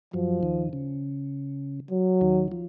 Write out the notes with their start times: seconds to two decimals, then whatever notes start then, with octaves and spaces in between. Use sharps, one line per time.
0.13 F#2 F3 F#3
0.43 D#2 D#3
0.73 C#3
1.91 F#3
2.21 D#2 D#3
2.52 F3